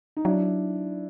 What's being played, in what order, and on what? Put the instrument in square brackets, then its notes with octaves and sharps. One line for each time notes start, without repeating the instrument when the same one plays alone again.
[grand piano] D#4
[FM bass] F#3 [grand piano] D4 E4